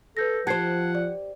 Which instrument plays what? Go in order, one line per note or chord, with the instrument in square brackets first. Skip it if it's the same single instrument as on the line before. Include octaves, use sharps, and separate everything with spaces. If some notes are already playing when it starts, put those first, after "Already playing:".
[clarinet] A4 [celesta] B4 G6 A#6
[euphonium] F3 [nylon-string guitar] G4 C5 [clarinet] F#5 [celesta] A5 G#6 C7
[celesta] D5